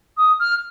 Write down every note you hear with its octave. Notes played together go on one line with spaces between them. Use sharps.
D#6
F6